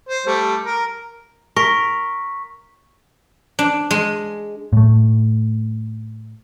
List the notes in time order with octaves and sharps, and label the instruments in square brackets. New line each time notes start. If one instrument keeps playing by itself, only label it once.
[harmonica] C5
G3 A3
A#4
[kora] A#4 [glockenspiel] C#6 B6
[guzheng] D4
G#3
[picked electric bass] A2 A3